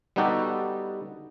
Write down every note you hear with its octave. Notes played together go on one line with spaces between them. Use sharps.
G3 B3 D#4 F#4 G4 A4